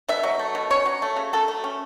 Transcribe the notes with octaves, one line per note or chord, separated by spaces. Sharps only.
B2 E5
F#3
A3
B2
C#4 C#5
F#3
A3
C#3
F#3 A4
A3
C#4